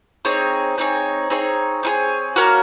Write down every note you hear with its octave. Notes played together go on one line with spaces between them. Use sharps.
C4 D#4 G#4 C#5
C4 D#4 G#4 C#5
C4 D#4 G#4 C#5
C4 D#4 G#4 C#5
A#3 C#4 F#4 A#4